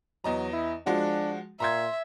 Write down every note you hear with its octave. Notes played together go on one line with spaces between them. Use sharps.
E2 F#3 D#5 A#5
E4
F3 G#3 D4 F#4
A#2 E5 A#5 C6 G#6